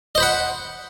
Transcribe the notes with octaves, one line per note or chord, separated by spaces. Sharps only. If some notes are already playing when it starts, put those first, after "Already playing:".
C5 D#5 F#5 B5